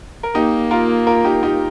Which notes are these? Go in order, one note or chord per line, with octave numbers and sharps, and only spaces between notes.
A#4
A#3 D#4 G4
F4 A#4
F4 A#4
D#4 G4
D#4 G4